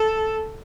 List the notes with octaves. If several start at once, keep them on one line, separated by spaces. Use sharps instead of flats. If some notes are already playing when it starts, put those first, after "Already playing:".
Already playing: A4